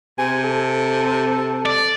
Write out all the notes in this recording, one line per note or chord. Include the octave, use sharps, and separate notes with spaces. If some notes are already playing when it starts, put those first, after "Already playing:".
C3 G#5
A4
D5